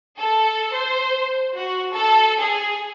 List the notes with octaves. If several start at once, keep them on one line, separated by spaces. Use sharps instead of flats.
A4
C5
F#4
A4
G#4